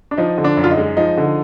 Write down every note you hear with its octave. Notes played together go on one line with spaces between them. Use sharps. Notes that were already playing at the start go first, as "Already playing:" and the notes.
D4
F3 D#4
D3
D4
F#2
F4
D#4
G#3
F3 D#4
D3